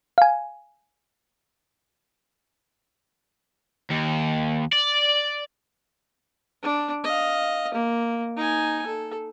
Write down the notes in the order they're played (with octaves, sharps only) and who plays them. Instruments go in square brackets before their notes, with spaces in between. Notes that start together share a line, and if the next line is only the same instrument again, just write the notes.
[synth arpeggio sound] F5 G#5
[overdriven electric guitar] D#2
D5
[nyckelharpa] D4
D#5 F5
A#3
D#4 G#5
A4